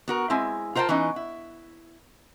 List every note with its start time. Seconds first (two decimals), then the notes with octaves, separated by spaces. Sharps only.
0.08 B3 F#4 A#4
0.30 G#3 C4 E4 G#5
0.75 F4 A#4 C5 F5 G5 A5
0.89 E3 B3 C#4 D#4
1.16 E4